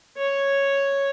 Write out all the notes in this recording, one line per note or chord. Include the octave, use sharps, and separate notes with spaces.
C#5